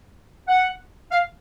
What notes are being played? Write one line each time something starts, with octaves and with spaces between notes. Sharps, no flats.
F#5
F5